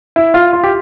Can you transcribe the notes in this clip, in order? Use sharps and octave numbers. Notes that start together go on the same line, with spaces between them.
E4
F4
F4
G4